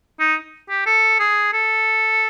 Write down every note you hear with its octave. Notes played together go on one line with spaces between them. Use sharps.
D#4
G4
A4
G#4
A4